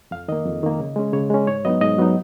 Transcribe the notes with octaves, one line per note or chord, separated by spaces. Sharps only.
F2 F5
D#3 A#3 D#5
F2
D#3 A#3
C#3
G#3 C#4
C#3 C#5
G#3 C#4
G#2 C#5
F#3 B3 D#4 D#5
G#2 D#5
F#3 B3 D#4